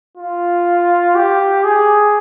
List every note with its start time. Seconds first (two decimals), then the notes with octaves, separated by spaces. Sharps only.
0.17 F4
1.15 G4
1.64 G#4